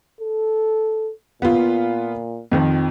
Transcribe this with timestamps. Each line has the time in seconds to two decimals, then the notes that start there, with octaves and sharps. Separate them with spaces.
0.20 A4
1.42 A#2 B3 F4
2.51 F2 D#3 F3